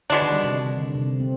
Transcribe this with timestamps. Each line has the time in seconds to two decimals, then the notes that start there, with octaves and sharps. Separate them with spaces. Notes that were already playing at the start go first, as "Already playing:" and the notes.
0.10 B2 D3 G#3 D4
0.22 D#3
0.32 G3
0.44 C3
0.78 D3
0.95 C3
1.20 C4